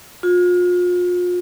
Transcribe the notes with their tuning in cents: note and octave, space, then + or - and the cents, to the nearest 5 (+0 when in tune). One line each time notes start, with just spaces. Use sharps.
F4 +35